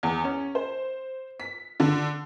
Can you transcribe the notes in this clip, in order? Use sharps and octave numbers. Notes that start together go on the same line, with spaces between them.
E2
C#4
C5
B6
D3